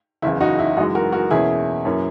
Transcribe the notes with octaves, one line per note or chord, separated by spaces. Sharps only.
F#1 E2 C#3 E4
D#4 F#4
E4
F#2 E3 G#3 D#4 F#4
F#4 A#4
F#4 A#4
E2 B2 A#3 C#4 E4 G#4
F#2 E3 A#3 C#4